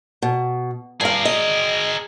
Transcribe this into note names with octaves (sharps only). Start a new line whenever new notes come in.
B2
G2 G#4 A#4 F5
D#5